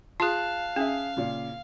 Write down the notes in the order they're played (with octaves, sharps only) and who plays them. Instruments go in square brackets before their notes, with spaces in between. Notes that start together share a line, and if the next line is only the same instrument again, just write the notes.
[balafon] F4 G#4 [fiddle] F5 [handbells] A5 F#6
[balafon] C#4 [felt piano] G#4 E5
[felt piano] A#2 C#3